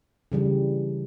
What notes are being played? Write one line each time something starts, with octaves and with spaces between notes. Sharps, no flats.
C#3 E3 G3